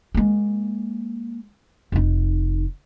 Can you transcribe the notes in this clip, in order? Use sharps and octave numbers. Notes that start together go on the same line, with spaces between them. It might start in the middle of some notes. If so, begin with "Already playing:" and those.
G#3 A#3
F1 D#4